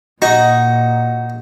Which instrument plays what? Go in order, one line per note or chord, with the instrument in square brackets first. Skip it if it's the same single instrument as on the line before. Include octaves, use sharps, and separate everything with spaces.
[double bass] A#2 [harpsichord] D#4 [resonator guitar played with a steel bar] F#4